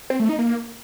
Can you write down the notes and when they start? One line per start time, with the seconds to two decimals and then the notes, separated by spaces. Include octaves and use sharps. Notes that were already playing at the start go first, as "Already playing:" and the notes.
0.10 C4
0.20 A3
0.29 D#4
0.39 A#3